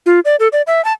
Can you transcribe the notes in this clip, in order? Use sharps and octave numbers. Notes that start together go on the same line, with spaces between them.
F4
D5
A4
D5
E5
A5